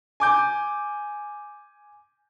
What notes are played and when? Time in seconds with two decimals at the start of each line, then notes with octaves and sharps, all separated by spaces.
0.20 G#5 D6 G6